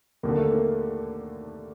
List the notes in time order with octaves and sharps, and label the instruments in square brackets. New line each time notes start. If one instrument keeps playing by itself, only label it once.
[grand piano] D#2 D3 A#3
A3
A#3